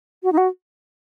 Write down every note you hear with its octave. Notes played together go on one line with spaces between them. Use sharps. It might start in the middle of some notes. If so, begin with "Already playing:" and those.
F#4
D#4
F#4